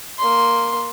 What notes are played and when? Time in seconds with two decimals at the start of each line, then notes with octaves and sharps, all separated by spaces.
0.19 A#3 C6